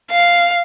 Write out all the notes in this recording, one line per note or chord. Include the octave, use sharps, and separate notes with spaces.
F5